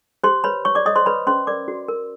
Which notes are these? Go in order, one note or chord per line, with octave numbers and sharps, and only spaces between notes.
G4 C5 C6
B4 C#5 B5
C#5 C#6
D5 D6
C#5 D#5 D#6
C5 C6
B4 C#5 B5
C#4 C5 C6
A#4 D5 D6
F#4
A#4